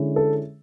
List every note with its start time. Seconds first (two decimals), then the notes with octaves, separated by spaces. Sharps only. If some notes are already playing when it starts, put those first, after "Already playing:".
Already playing: D3 G#3 C#4 E4
0.16 A4